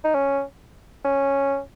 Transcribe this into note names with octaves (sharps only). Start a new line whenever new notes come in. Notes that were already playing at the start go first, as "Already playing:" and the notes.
D#4
C#4
C#4